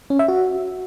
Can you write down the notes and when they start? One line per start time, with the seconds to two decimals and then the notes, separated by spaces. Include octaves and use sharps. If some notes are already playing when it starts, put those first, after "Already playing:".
0.10 C#4
0.19 E5
0.28 F#4